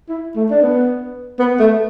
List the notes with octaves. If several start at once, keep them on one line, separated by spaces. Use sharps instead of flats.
E4
A3
D4
B3
B3
A3